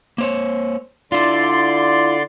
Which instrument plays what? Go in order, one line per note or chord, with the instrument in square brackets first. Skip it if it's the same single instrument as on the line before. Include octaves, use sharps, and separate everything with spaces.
[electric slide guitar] A#3 C5 C#5
[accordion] D3 D5 C6 [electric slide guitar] E4 F4